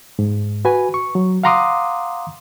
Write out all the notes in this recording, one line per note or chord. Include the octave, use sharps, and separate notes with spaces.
G#2
F#4 B4 G#5
C#6
F#3
F5 F#5 A#5 C6 D6 D#6